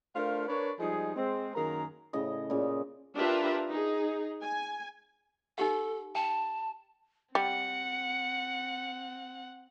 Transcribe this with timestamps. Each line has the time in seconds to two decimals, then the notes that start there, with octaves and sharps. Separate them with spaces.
0.16 A3 D4 F4 A#4 C5 F5
0.48 D4 A#4 B4 C#5
0.80 F3 G3 G#3 D#4 G#4
1.15 G#3 C4
1.55 F#2 D#3 A#3 G#4 A#5
2.13 A2 C#3 D#5
2.50 A#2 C#3
3.16 D4 F4 G4 A#4 B4 E5
3.70 D#4 G#4
4.42 G#5
5.58 D#4 G4 A4 F#5
6.15 G5 A5
7.35 G3 C4 F#5 C#7